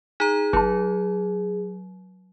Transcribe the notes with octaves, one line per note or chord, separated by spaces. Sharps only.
D#4 G#4 A#5
G1 F#3 A5